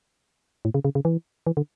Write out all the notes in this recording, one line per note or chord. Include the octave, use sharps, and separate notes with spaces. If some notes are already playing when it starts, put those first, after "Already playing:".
A2
C#3
C#3
C#3
E3
E3
D3